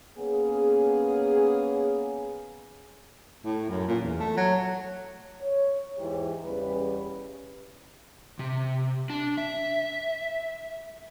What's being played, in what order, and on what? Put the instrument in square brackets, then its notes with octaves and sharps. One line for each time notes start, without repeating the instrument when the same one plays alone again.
[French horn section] A#3 B3 C#4 G#4
[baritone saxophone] A2
F#2
A#2
E2
A3
F#3
[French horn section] C#5
E2 G#2 E3 G4
E2 C#3 G3 B4
[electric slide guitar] C3
D4
E5